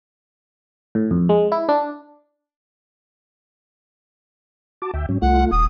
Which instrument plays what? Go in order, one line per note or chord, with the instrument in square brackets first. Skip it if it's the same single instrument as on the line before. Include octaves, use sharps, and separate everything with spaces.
[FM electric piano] A2
F2
G#3
E4
D4
[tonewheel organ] F#4 A5 D6
D2 E5 G5
G#2 F#3 C#4
[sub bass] C2 [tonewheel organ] A3 F4 [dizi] F#5
[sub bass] D#1 [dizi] D#6